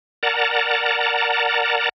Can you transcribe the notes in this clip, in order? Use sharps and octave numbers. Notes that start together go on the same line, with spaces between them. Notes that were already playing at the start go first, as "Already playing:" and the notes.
A#4 D5 F#5 A5 A#5